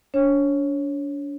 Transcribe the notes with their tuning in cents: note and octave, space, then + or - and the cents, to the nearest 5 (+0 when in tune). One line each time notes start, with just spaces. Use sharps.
D4 -40 C#5 -20